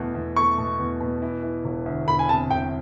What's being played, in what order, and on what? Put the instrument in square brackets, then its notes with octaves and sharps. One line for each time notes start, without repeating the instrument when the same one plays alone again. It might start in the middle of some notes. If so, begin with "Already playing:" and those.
Already playing: [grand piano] E2 B2 A3
E2
[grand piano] A3 [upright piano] C#6
[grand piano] B2
E2
B2
E3
E3
E1
D2
[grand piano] E1 [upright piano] B5
[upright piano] G#5
[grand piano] C3 [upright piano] A5
[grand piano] E1 [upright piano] G5